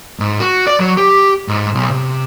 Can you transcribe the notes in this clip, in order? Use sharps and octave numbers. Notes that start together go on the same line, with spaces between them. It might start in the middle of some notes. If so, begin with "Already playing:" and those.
G#2
F#4
D5
F#3
G4
G#2
B1
C3